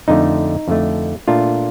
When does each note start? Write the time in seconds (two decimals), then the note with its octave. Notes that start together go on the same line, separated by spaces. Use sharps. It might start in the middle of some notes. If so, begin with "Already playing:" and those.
0.08 F2 D3 A3 D#4
0.68 F2 D3 A3
1.28 A#2 A3 D4 F4